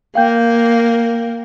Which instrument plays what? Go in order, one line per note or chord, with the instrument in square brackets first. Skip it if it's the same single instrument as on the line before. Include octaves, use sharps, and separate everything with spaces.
[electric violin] A#3 A#4 [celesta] F5 G5 G6